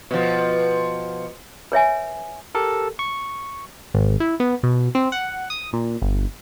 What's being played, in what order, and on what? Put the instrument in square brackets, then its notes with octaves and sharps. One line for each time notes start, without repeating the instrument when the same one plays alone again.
[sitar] B2 F3
[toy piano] B4 C#5 E5 G#5
[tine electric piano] G4 A4 A#4
C#6
[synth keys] G#1
E4
B3
B2
C4
F#5
D#6
A#2
G1